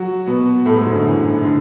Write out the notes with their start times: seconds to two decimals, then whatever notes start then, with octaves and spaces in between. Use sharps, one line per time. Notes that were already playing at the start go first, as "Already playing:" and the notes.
Already playing: F#3 F#4
0.27 B2 B3
0.65 A2 A3
0.76 G#2 G#3
0.85 F#2 F#3
0.95 D3
1.04 E3
1.43 D3